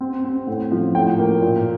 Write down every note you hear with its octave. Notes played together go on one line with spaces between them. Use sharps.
C4
C4
A2
F3
A2 G5
A#3
A#2